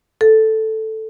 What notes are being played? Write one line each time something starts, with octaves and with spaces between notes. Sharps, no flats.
A4